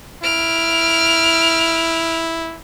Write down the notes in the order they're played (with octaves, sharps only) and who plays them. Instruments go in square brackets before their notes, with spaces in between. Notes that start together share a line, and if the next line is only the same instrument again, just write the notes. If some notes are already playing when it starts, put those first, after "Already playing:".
[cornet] E4 [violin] F6 D7